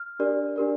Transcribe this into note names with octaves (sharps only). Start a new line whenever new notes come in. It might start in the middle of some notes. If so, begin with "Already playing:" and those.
Already playing: F6
D4 G4 A#4 D5
D4 G4 A#4 D5